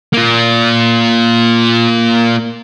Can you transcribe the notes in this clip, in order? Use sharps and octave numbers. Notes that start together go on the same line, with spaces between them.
A#3 F4